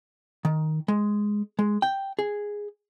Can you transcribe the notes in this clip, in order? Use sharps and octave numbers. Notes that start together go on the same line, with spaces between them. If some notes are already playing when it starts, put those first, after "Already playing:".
D#3
G#3
G#3
G5
G#4